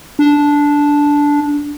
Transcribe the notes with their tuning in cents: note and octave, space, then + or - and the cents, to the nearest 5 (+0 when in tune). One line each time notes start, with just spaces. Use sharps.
D4 -10